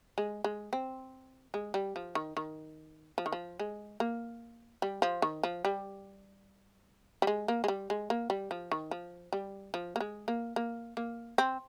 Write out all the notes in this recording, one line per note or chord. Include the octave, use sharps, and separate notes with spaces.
G#3
G#3
C4
G#3
G3
F3
D#3
D#3
F3
D#3
F3
G#3
A#3
G3
F3
D#3
F3
G3
G3
G#3
A#3
G#3
G3
G#3
A#3
G3
F3
D#3
F3
G3
F3
A#3
G#3
A#3
A#3
A#3
C4